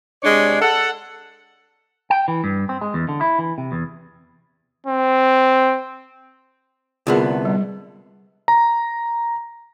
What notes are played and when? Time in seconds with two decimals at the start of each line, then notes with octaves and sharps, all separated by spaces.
0.23 C3 G#3 D4 C#5 D5
0.61 A4 F#5
2.10 G5
2.28 E3
2.44 G2
2.69 C4
2.81 G#3
2.94 E2
3.09 D3
3.21 E4
3.39 E3
3.58 C3
3.72 E2
4.87 C4
7.07 C2 D3 B3 F4 G#4 A#4
7.45 G3
8.48 A#5